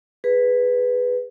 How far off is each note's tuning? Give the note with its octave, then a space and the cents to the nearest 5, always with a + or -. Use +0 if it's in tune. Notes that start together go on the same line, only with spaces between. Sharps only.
G#4 -15 B4 +0